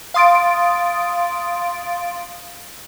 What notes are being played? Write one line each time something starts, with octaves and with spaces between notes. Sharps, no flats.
F5 C6 D#6 A6 D7